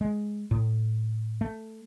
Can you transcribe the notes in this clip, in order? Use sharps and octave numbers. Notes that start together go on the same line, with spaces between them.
G#3
A2
A3